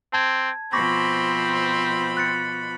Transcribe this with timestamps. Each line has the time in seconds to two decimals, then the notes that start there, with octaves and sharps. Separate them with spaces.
0.13 C4 A5 G#6
0.73 B2 F3 C4 B5 C#6 D6 A#6
2.17 F#6 A6 C#7